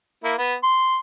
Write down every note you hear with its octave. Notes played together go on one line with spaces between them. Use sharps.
A#3 E4
B3
C6